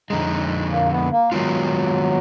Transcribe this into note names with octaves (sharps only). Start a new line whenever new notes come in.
F2 D3 G#3 D#4
A#3
B3
A#3
D#3 F#3 G#3 B3 F4